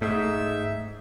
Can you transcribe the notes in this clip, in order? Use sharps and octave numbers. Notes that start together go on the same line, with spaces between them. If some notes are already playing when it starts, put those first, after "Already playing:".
G#2 A3 E5